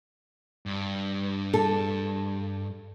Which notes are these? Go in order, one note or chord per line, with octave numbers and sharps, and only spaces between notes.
G2
A4